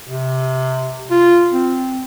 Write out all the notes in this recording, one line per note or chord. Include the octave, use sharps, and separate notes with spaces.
C3
F4
C4